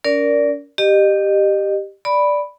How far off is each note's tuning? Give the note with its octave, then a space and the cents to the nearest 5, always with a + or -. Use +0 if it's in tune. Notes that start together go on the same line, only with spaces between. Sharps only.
C#4 +40 A#4 +0 D5 -10
G4 +0 D#5 -30
D5 +0 B5 +0